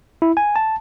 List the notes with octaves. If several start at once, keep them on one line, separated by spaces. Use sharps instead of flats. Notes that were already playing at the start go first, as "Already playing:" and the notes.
E4
G#5
A5